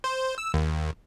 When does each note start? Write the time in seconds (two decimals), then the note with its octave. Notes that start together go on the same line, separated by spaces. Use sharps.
0.04 C5
0.38 E6
0.54 D#2